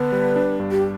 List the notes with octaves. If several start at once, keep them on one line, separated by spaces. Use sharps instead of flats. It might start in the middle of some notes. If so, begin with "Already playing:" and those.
Already playing: D3 B3 D4 B4
G3
D4
G2
G4